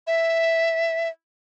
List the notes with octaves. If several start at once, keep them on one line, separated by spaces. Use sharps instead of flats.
E5